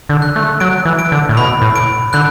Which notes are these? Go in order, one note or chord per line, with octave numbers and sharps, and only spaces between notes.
D3
F#6
A3
F#3 D7
E3
D7
D3
A2
B2 B5
A2
D7
D3 F#6